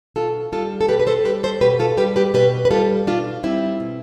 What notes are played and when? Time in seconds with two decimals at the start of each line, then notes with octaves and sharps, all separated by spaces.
0.16 B2 F4 A4
0.52 G3 F4 A4
0.81 A4
0.88 B2 G4 B4
1.00 B4
1.07 A4 C5
1.25 G3 G4 B4
1.43 A4 C5
1.61 B2 G4 B4
1.79 F4 A4
1.97 G3 G4 B4
2.16 G4 B4
2.34 B2 G4 B4
2.65 B4
2.71 G3 F4 A4
3.07 B2 D4 F4
3.43 G3 C4 E4
3.80 B2